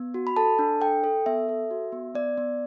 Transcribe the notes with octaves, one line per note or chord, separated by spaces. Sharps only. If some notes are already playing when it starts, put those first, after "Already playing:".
Already playing: B3
F#4
B5
A4 A5
D4
A4 G5
A4
B3 E5
A4
F#4
B3
B3 D5
B3